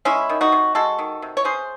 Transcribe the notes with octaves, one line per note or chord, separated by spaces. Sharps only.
G#3 C#4 E4
D#3
D#4 F#4
C3
G#3 F#4 A4
D#3
C3
C#5
C#4 G#4 C5